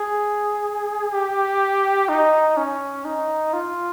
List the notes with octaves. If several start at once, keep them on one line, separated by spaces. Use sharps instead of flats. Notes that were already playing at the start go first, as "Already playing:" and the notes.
Already playing: G#4
G4
D#4
C#4
D#4
F4